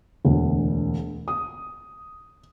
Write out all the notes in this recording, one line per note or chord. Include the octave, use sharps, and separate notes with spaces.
E1 D2
D#6